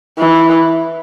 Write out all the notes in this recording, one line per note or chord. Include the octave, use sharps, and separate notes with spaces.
E3